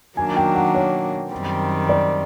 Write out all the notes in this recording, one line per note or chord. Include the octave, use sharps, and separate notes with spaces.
D#3 F#3 A#3 D4 G#5
G5
F#5
C#5
F#2 D#3 G3 C4
D5